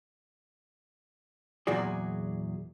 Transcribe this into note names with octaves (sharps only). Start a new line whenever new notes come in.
E2 A#2 F#3 F#4 G#4 D5